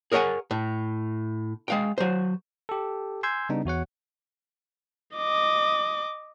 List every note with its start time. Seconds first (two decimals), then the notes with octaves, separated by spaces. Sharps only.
0.12 G#4 A#4 C#5 D#5 F#5 G#5
0.51 A2
1.68 G#3 F5 G5
1.98 F#3 C5
2.69 G4 A4
3.23 G#5 C6 E6 G6 G#6
3.49 C#3 G3 B3 D4 D#4
3.65 E2 F#4 C#5 F#5
5.16 D#5 D6